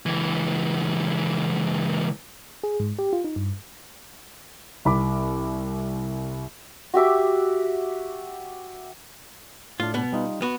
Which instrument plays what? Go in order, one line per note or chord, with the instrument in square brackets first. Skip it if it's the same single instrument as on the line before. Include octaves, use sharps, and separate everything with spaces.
[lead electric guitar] C#2 E3
[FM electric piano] G#4
G#2
G4
F4
D#4
G2
[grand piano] C2 B5 D6
[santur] F#4 G4 E5 D6
[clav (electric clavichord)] A2 D4 [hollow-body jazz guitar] F4
[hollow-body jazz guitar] B2 B3
[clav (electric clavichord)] G3 D#4 F4
[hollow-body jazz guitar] B3 F#4